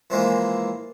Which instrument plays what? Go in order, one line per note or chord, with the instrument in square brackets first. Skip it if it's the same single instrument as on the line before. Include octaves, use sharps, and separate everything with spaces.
[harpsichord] E3 F3 G#3 A#3